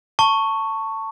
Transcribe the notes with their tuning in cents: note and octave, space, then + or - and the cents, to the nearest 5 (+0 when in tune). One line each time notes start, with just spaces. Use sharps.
A5 +20 C#6 +0